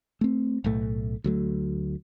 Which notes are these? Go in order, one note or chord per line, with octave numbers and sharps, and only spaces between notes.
A3 C4
B1 A2 A3
D2 F#3 A3